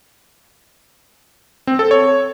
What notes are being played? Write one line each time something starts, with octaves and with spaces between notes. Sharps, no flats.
C4
A4
C#5